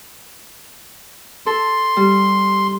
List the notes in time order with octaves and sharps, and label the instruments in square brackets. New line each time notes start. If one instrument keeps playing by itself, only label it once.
[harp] A4 [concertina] C6
[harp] G3